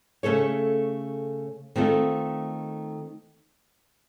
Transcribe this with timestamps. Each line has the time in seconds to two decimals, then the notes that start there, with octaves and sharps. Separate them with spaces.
0.23 C#3 A3 C#4 A4 C#5
1.76 D#3 A3 C4 F4 A4